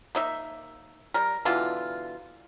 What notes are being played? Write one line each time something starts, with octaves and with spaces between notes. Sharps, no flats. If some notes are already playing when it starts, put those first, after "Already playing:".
A#3 D#4 E5
G3 A#4
B2 D3 E3 F4